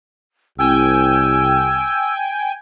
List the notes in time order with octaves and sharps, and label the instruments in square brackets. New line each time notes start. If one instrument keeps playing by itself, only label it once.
[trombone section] C2 [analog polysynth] G5 G#5 [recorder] E6